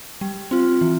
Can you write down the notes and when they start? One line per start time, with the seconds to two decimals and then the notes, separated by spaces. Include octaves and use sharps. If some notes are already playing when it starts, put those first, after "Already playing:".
0.21 G3
0.51 C4 F4
0.81 E3